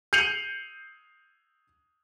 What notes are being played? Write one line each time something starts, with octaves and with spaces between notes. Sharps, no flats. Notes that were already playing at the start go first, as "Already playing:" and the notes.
G6 C7 C#7 D#7 F7 F#7